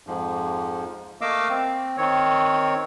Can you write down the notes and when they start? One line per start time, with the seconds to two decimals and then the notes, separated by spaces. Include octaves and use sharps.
0.07 F2 G#2 F3
1.21 A3 A#3 D#5 F5 D6 E6
1.49 C4
1.98 D#3 C4 C#5